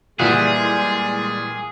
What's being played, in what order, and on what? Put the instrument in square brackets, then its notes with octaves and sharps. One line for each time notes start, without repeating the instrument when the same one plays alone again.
[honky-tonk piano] A#2 E3 [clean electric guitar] G3 E5 F#5 [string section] G#3 [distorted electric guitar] G#4